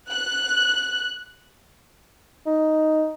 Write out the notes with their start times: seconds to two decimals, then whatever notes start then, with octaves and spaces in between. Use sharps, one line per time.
0.11 F#6
2.46 D#4